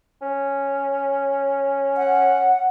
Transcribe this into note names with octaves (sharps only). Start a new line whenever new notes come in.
C#4
F#5